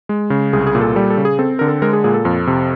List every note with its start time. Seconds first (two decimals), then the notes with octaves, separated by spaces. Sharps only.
0.09 G#3
0.30 C#3
0.53 C2 G#4
0.67 G#4
0.75 A#2
0.81 A4
0.95 G3 A4
1.10 A4
1.17 C#3
1.25 G#4
1.39 C4 A4
1.59 D3 A#4
1.68 A4
1.82 G#3 A#4
1.93 G#4
2.04 A#2 G#4
2.14 A4
2.25 F2
2.47 C3